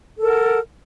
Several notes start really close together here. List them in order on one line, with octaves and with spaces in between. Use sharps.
A4 A#4 F#5